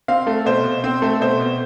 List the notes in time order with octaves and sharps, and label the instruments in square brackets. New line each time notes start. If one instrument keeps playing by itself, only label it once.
[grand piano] C4 F5
A3
B2 C5
B2
C4
A3
B2 C5
B2